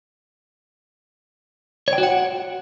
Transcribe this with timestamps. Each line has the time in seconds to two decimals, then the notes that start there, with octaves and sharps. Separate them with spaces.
1.88 C#5
1.93 G5
1.98 F#4
2.03 F#5